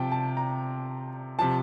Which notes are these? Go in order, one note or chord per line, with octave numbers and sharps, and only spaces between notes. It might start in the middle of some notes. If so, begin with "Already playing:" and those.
Already playing: C3 F3 G5 A5
A5
A#5
C3 F3 A5